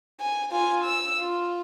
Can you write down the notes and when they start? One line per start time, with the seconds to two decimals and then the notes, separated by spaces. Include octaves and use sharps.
0.20 G#5
0.52 F4 G#5
0.84 E6
1.20 F4